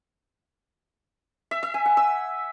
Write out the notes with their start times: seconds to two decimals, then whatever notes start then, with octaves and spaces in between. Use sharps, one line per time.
1.51 E5
1.63 E5
1.74 G#5
1.86 F#5
1.97 E6